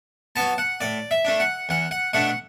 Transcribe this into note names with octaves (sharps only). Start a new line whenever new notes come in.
F#3 B3 A5
F#5
A2 D5
E5
A3 D4
F#5
E2 F#5
F#5
B2 A3 D4 F#5